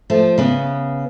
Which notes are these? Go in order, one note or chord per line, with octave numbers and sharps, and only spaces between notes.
F3 A3
C#3 B3